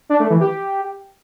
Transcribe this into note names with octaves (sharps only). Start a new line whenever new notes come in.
D4
A3
E3
G4